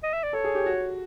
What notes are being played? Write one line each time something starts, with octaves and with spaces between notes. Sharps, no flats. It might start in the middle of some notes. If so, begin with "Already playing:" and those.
D#5
E5
D5
A4 C#5
G#4
G4
F#4